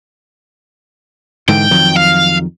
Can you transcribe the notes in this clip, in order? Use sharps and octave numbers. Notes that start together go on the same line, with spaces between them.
G#2 D3 E3 G5
F2 D#3 F#3
F5